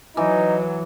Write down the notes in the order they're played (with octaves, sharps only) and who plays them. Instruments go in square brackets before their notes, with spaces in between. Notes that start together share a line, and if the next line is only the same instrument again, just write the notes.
[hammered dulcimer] E3 [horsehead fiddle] F#3 [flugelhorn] D#4